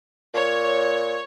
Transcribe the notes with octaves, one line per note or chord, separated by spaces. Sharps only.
A#2 C#5